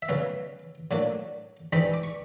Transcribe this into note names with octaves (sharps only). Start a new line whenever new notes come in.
E5
C#3 F#3 B3 F5
A2 F#3 A#3 D4
G2 E3 G#3 C4 D#4 B5
D6
C#6